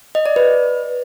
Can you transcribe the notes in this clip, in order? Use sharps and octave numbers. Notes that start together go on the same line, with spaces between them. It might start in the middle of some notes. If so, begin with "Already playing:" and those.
D#5
D5
B4